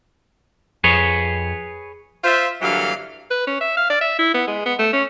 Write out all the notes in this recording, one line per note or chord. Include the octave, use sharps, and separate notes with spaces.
F2 G#4 B4 C#5
F4 C5 E5
G2 D3 E3 F#3 A#3 F5
B4
C#4
E5
F5
D5
E5
E4
B3
G#3
B3
A3
C#4